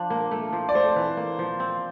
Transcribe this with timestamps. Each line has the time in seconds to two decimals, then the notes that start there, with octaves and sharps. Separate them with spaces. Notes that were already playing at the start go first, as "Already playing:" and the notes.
Already playing: F3 D4
0.10 A#3
0.31 A3
0.53 F3
0.69 D5
0.75 A3 C5
0.96 E3
1.17 A#3
1.39 F3
1.60 C4